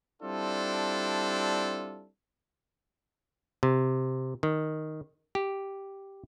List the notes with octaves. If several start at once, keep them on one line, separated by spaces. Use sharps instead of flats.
G3 C4 D4 E4 F4 A4
C3
D#3
G4